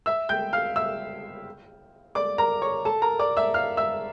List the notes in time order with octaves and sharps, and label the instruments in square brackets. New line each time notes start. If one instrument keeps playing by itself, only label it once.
[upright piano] E5 E6
G5 G6
F5 F6
E5 E6
D5 D6
A#4 A#5
C#5 C#6
A4 A5
A#4 A#5
D5 D6
E5 E6
F5 F6
E5 E6